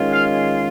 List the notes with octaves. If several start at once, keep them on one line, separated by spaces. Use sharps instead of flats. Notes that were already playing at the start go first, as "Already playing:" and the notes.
Already playing: D#3 G#3 C#4 F4
F5